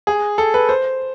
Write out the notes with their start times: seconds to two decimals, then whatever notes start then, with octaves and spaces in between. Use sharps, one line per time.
0.07 G#4
0.38 A4
0.54 B4
0.69 C5